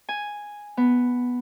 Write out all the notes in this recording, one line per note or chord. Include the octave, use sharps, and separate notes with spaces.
G#5
B3